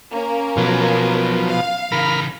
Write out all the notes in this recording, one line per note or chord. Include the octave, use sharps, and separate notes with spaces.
A#3 C#4 A#4
B1 B2 F3 F#3
F5
C#3 E3 A#4 B5 F6